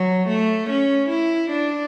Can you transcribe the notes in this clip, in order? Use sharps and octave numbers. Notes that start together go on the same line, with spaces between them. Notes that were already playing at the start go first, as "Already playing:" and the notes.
Already playing: F#3
A3
C#4
E4
D4